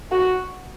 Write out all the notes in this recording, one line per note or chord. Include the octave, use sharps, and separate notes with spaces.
F#4